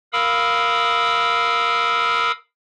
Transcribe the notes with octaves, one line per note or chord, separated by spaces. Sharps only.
A#4 F5 B5 D#6 E6